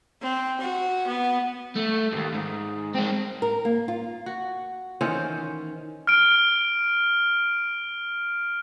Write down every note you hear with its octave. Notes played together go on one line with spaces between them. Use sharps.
C4
F#4
B3
A3
D#2 G#2
G#2
G#3 C4
A#4
A#3
F4
F#4
D#3 E3 C#4 C5
F6 D7